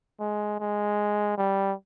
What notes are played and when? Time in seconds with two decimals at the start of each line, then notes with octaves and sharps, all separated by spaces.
0.20 G#3
0.60 G#3
1.38 G3